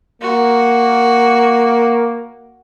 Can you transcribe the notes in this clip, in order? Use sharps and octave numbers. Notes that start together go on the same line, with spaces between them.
A#3 F#4